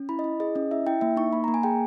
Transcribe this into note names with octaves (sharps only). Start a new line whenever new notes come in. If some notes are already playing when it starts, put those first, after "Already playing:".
Already playing: C#4
E4 B5
D#5
E4
G#4 D#5
C#4 D#5
E4 E5
E4 G5
A#3 E5
D#4 C#6
A#3 B5
A#5
A#3
G#5
G#4 G5